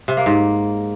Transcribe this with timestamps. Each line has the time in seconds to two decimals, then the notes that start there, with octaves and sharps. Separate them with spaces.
0.08 C3
0.17 A#3
0.26 G#2